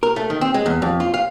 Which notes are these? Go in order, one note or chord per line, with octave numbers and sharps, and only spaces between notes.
A#4
A3
D#3
C4
G#3
E2
F2
F4
F5